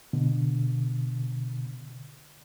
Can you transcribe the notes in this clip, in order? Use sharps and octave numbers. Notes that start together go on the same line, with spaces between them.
B2 D3